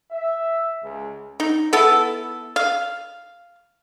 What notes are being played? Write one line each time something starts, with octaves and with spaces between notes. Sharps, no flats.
E5
C#2
D#4
B3 E4 A4
F5